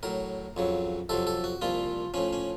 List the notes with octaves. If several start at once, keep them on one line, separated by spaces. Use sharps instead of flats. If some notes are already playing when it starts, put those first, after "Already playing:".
A2 F#3 A#4
F2 C#3 F#3
F2 C3 F#3 A4
A4
F#4
C2 A#2 F3 F4
A2 F3 C#4
C#4